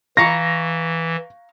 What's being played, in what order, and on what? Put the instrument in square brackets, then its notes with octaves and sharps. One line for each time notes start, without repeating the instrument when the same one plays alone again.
[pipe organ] E3 [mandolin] F5 A#5 C#6 [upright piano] A#6